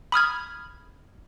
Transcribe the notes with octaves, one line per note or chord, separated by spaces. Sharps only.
B5 D#6 F6 G#6